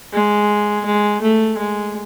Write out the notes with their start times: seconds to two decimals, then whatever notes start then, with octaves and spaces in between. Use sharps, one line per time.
0.13 G#3
0.85 G#3
1.22 A3
1.57 G#3